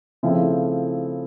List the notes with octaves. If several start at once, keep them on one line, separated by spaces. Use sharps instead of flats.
C#3 F3 A3 C4 E4